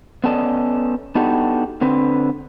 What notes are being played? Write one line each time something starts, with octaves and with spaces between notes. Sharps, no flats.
B3 C#4 A4 D5 D#5
B3 D4 D#4 F#4 G4 A4
D3 C4 B4